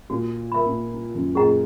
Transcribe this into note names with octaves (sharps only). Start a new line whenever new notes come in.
A#2 F#4
A#4 E5 B5
A#2
E4
F#2
A#2 G#4 D#5 F#5 A#5